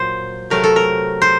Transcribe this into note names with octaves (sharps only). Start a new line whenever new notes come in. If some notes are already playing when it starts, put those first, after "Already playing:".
Already playing: A#2 F#3 C5
C3 F#3 A3 A#4
A4
A#4
C5